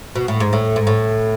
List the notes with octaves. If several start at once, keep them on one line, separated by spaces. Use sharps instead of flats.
B2
A2
G#2
A2
G#2
A2